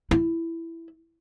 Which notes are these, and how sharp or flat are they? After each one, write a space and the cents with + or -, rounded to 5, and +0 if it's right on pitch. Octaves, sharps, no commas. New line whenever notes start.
E4 +10